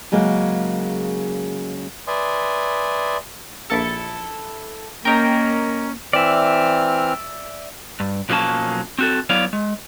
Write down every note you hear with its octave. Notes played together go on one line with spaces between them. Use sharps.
C#3 F#3 G#3 A#3
B4 D5 E5 G#5 C6 D#6
A#1 E4 A4 A6 C#7
A#3 C#4 A#4 D#5 G5 A#5
E3 C4 D5 E5 F6
G2
B1 F3 F#3 A#3 C#4 A5
C4 F#4 A4
F#3 B3 E4 C#5 D5 F5
G#3